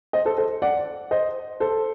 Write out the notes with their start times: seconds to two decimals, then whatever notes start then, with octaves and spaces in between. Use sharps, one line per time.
0.13 C5 D#5
0.25 A4 C5
0.38 A4 C5
0.62 D5 F#5
1.11 C5 D#5
1.60 A4 C5